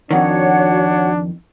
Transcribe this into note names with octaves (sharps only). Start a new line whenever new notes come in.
F2 D#3 D4 F#4 C#5 F#5